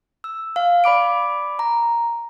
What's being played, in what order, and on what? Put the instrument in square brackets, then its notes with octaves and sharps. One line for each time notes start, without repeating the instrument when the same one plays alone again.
[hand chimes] E6
F5
D5 B5 D6 D7
A#5